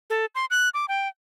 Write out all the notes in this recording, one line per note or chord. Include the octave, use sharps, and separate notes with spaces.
A4
C6
F#6
D6
G5